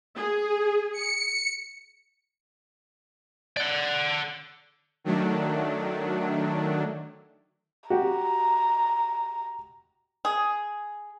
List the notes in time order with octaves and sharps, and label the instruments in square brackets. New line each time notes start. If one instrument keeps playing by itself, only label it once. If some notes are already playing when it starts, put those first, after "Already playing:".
[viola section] G#4
[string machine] C#7
[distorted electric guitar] D5 F#5
[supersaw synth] D#3 F#3 A3 D4
[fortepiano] F#4 G4 [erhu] A#5
[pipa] G#4